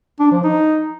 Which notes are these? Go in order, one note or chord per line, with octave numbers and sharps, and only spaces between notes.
D4
F3
D#4